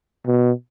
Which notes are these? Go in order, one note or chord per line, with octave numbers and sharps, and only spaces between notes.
B2